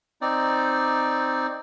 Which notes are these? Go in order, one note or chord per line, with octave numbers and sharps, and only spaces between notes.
C4 D#4 D5